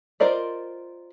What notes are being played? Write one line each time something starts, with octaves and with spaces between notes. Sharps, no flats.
F4 A#4 C5 D5 D#5